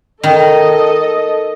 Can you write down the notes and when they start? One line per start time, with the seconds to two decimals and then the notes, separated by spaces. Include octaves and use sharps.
0.23 D#3 A4 D#5